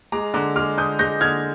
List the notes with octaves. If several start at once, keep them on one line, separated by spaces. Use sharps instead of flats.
G#3 A#5 D6
D3 A#5 D6
G#3 D6 F6
D3 D#6 G6
G#3 G6 A#6
D3 F6 G#6